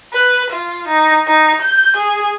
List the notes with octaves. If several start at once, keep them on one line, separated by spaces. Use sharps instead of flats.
B4
F4
D#4
D#4
G6
G#4